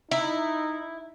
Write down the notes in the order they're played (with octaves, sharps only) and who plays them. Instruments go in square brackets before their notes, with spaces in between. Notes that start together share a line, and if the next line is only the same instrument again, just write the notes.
[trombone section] D#4 [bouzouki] E4